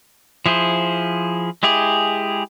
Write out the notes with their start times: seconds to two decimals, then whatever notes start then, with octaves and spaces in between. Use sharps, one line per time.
0.46 F3 E4 G#4 C5
1.63 G#3 E4 G4 G#4